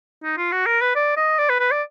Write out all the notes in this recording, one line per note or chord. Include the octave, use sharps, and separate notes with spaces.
D#4
F4
F#4
A#4
B4
D5
D#5
D5
B4
B4
D5